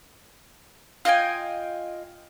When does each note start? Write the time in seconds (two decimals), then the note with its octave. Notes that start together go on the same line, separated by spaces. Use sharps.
1.05 F4 D#5 G5 G#5